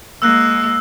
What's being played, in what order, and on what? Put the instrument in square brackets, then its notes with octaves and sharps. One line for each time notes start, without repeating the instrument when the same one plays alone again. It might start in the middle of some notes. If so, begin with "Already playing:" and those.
[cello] G#3 A#3 [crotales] E6 F#6